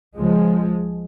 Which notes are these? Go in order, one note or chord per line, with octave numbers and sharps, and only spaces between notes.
C#2 C#3 F3 G#3